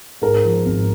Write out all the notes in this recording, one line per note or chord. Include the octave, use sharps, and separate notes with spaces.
G#2 A#4
F3
G#1